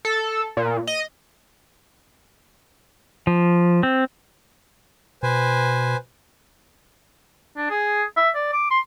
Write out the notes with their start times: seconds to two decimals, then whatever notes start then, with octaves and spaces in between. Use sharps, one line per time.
0.05 A4
0.57 A#2
0.87 D#5
3.27 F3
3.83 C4
5.23 B2 B4 C5 G#5
7.57 D4
7.70 G#4
8.17 E5
8.35 D5
8.53 D6
8.71 C6